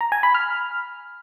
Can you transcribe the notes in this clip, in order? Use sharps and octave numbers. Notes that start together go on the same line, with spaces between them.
A#5
G#5
B5
F6